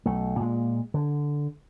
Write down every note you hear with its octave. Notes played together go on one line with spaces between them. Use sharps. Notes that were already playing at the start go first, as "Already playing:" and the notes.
B1 A3
A#2 G#3
D3